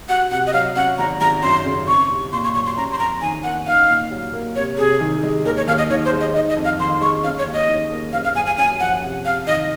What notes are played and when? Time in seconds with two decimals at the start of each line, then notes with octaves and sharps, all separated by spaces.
0.09 F#4 F#5
0.31 C3 F#5
0.47 D#5
0.53 F#3 F5
0.76 C#4 F#5
0.98 G#1 A#5
1.21 G#1 A#5
1.43 F#2 C6
1.65 C#3
1.87 C4 C#6
2.10 C2
2.33 A#2 C6
2.44 C#6
2.54 F#3 C#6
2.66 C6
2.77 C#4 A#5
2.92 C6
2.99 F2 A#5
3.21 D#3 G#5
3.44 A#3 F#5
3.67 D#4 F5
3.89 A#2
4.11 F#3
4.34 A#3
4.56 C3 C#5
4.78 C3 G#4
5.01 D#3
5.23 G#3
5.45 D#2 A#4
5.57 C#5
5.68 D#2 F5
5.78 D#5
5.90 D#3 C#5
6.05 C5
6.13 G#3
6.20 D#5
6.34 D#4 D#5
6.49 D#5
6.57 F2
6.65 F5
6.79 D#3 C6
7.01 G#3 C#6
7.24 C#4 F5
7.38 C#5
7.46 D#2
7.54 D#5
7.69 D#3
7.92 A#3
8.13 F#1 F5
8.24 F5
8.35 F#1 G#5
8.46 G#5
8.58 F#2 G#5
8.80 F3 F#5
9.03 C3
9.25 C3 F5
9.47 D#3 D#5